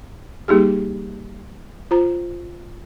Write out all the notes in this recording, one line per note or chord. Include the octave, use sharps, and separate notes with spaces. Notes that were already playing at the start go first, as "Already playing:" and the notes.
G3 A#3 D#4 G4 G#4
F4 C5 A#5